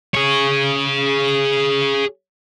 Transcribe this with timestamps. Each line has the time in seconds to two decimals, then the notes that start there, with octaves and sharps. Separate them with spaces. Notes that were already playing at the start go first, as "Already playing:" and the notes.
0.14 G#4 C#5